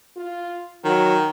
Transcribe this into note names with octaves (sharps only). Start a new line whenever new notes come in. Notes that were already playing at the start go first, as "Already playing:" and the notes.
F4
D#3 F#3